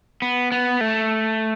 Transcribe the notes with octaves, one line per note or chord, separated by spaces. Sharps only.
B3
B3
A3